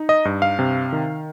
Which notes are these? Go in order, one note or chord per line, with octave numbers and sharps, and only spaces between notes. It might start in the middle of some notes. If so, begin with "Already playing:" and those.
Already playing: D#4
D#5
G2
F5
C3
D#3